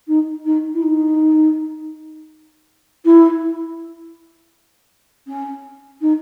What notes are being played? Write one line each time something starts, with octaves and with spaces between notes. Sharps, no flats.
D#4
D#4
E4
D#4
E4
C#4
D#4